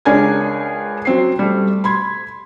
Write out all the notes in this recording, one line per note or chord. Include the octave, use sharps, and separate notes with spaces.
C#2 D4 A#4 C#5 G#5 G#6
F#3 C4 C7
G3 A3
B5 C6 G#6